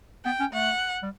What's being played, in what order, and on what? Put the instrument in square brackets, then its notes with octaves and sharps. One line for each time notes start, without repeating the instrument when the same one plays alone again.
[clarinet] B3 [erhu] G5
[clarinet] C#4
[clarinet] A3 [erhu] F#5
[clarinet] G3